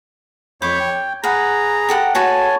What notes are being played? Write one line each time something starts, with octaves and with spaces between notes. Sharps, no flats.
F2 C#5 B5 D6 G6
G5
G#4 B4 F#5 A#5
G4 A4 F#5
F#4 A4 B4 C#5 G#5 A5